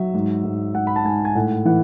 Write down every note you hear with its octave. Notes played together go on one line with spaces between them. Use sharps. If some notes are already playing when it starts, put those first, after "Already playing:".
Already playing: F#3 E5
G#2
G#2
G#2 F#5
B5
A5
G#2 G#5
G#5
A2 F#5
E3 F#5